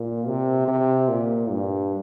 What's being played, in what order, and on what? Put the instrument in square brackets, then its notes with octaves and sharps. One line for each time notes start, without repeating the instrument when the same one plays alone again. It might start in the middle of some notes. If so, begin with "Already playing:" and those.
Already playing: [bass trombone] A#2
C3
C3
A#2
G2